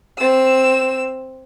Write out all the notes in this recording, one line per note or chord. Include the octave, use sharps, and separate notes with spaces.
C4 E6